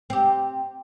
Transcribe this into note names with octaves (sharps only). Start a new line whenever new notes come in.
C4 G4